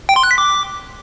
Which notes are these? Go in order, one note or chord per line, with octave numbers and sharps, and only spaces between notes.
G5
C6
F#6
B6
D6